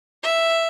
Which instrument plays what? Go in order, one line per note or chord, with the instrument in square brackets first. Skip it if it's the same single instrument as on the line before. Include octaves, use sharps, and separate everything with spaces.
[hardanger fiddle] E5